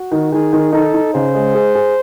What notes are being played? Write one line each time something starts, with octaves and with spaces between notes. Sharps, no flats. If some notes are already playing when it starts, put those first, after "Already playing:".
Already playing: F#4
D#3
D#3 G#4
D#3
D#4 A4
D#4
C#3 C5
G#3
G#4
G#4